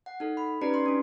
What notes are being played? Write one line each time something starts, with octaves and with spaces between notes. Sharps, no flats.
F#5
D#4 A4
B5
C#4 D#4 G4 B4 D5 A#5
C6
C#4 D4